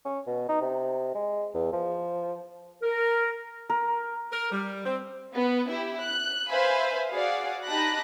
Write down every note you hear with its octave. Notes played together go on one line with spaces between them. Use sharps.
C#4
B2
D#4
C3
G#3
E2
F3
A#4
A#4
A#4
G3
C4
B3
E4 G4
F#6
B4 C5 E5 F5 G#5 B5
F#4 G#4 D5 F5 F#5
D#4 G4 A5 B5 F#6 A#6